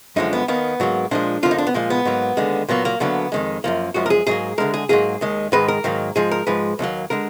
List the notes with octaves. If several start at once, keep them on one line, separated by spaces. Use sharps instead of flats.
F#2 D3 F3 G#3 D#4
B3
D#2 D#3 A#3 B3
G#2 F#3 A#3
A#2 F3 G#3 D4
F2 D3 F3 A#3 F4
D#4
D4
B3
A#2 F3 G#3 A#3
B3
G#2 F#3 A#3
D#2 D3 G#3
A#2 F#3 A#3 B3
A#3
D2 D3 F#3 A#3 B3
F2 D#3 G#3
F#2 F3 A#3
F#2 F3 G#3 F#4
A#4
G#4
G#2 F#3 A#3 G#4
D2 D3 G#3 A#4
G#4
G#2 F#3 A#3 G#4
D#2 D#3 G#3
G#2 D#3 G#3 B4
A#4
G#2 D#3 F#3 A#3
G#2 F3 G#3 G#4
A#4
G#2 F3 G#3 B4
D#2 D#3 F#3 A#3
D3 G#3 A#4